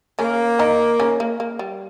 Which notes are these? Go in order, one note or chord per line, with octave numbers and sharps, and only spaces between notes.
C#3 A#3 C#4
D#3 D#4
C#3 C#4
A#3
A#3
G3